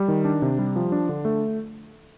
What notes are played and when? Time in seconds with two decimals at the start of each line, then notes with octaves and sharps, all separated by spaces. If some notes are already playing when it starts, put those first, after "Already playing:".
Already playing: G3
0.08 D#3
0.25 D4
0.42 C3
0.59 G3
0.76 F3
0.92 D4
1.09 D3
1.25 A3